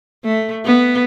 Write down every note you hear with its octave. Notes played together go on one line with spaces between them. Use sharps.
A3
B3